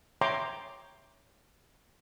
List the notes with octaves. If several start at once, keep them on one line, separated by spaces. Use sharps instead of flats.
C#5 E5 G5 A#5 C6 D6